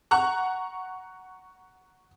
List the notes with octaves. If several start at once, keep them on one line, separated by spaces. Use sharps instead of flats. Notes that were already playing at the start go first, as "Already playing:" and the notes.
F#5 A#5 C#6 F#6